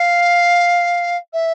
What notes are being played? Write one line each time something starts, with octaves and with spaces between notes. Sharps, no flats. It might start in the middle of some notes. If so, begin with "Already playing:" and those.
Already playing: F5
E5